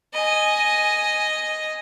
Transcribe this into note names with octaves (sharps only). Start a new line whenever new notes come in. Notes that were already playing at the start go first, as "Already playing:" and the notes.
D#5 G#5